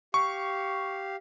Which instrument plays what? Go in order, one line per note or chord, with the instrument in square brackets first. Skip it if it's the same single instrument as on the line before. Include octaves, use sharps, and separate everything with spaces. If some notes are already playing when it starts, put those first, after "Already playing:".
[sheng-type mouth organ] G4 F5 [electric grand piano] C#6